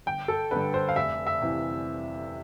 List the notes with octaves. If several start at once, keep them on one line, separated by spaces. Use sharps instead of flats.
G1 G5
A4
G2 D3 B4
C5
F5
F1 E5
E5
C3 E3